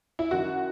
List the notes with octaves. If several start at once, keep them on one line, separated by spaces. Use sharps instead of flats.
E4
F#2 D#3 F#4